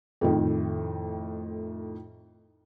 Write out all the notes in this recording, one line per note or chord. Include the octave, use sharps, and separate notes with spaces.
F2 A2 D#3